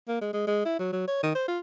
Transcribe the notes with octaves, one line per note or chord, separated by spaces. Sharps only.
A#3
G#3
G#3
G#3
E4
F#3
F#3
C#5
D#3
C5
F4